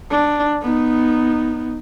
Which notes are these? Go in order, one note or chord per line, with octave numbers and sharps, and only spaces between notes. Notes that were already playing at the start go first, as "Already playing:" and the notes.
D4
B3 D#4